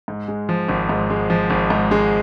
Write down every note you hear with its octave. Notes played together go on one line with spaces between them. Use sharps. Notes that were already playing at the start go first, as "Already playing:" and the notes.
G#2
G#3
F3
G#1
G#2
G#3
F3
G#1
G#2
G#3